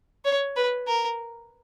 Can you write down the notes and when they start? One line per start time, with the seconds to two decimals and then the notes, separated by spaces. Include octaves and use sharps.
0.25 C#5
0.56 B4
0.87 A#4